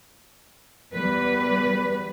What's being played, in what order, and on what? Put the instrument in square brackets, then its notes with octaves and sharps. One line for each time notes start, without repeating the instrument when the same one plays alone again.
[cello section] E2 G3 B4